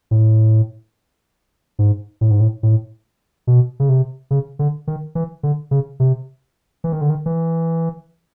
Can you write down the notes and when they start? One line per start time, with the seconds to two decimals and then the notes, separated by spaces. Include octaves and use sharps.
0.11 A2
1.79 G#2
2.21 A2
2.31 G#2
2.40 A2
2.63 A2
3.47 B2
3.80 C#3
3.89 C3
4.31 C#3
4.59 D3
4.87 D#3
5.15 E3
5.43 D3
5.71 C#3
6.00 C3
6.84 E3
6.92 D#3
7.01 D3
7.10 D#3
7.26 E3